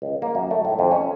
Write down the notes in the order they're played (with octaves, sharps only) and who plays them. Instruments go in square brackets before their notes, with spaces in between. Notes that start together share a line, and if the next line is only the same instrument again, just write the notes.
[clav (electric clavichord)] C#2
A#3
F#2
A3
A2
F2
C#4